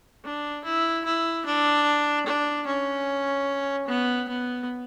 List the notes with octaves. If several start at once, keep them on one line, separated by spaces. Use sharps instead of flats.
D4
E4
E4
D4
D4
C#4
B3
B3